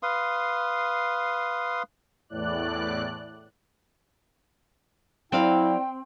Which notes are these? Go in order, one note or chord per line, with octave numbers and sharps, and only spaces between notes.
B4 F5 C6 D#6
E2 A2 D5 F#6
F#3 C4 E4 D5 F5 G5